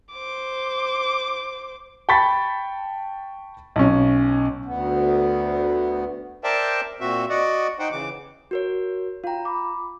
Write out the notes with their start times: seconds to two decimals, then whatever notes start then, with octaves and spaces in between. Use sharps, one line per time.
0.12 C5 D6
2.09 G5 A5 B5 C#6 A6 B6
3.76 B1 C#4
4.65 D2 B3
6.44 A#4 C5 D5 E5 G5 A5
7.01 A#2 C4 F#4 E5
7.29 F#4 D5 D#5 F#5
7.79 D#4 C5 F#5 G5
7.92 C#3 E3 D6
8.51 F#4 A#4 C#5
9.24 F4 F5 G5 A#5
9.45 B5 D6